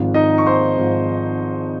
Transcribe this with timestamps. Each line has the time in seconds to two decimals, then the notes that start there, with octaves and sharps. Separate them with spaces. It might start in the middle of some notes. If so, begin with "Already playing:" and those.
Already playing: G#1 G#2 F3
0.14 D#4 D#5
0.38 C#6
0.46 C5 C6
0.78 G#1 G#2 F3